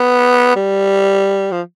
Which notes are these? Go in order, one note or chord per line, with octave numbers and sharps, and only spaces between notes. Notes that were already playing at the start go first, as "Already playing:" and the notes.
Already playing: B3
G3
F3